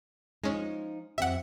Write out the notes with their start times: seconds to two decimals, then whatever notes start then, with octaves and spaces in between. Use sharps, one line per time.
0.44 F3 G#3 C#4 D#4
1.18 F2 C4 G4 E5 F#5